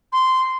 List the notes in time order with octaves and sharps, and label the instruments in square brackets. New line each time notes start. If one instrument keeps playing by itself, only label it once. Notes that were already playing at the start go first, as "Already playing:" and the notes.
[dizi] C6